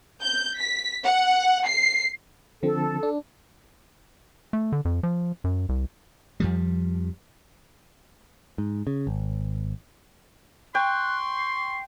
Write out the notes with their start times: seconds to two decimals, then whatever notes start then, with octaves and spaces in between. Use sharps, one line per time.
0.22 G6
0.58 B6
1.05 F#5
1.67 C7
2.63 D3 F3 C4 A4
3.03 D4
4.53 A3
4.72 D3
4.85 F2
5.03 F3
5.44 F#2
5.69 C2
6.40 F2 F3 G3
8.58 G#2
8.87 C#3
9.07 G#1
10.75 G5 C6 C#6 F#6
11.37 C7